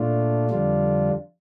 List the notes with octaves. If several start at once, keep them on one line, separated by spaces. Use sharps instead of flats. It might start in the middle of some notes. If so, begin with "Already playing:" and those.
Already playing: A#2 A3 D4 F4
F2 D3 G3 D4 F4